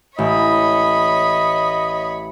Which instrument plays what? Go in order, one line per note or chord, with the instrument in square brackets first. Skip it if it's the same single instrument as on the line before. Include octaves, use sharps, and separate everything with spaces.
[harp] A1 [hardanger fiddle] C#5 B5 [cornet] D#5